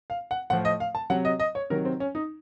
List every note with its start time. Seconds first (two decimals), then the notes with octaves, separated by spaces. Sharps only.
0.10 F5
0.31 F#5
0.50 A2 F3 F#5
0.65 D#5
0.80 F5
0.95 A5
1.10 C3 F#3 F#5
1.25 D#5
1.40 D#5
1.55 C#5
1.70 C3 D#3 F#3 A#4
1.85 C4
2.00 C#4
2.15 D#4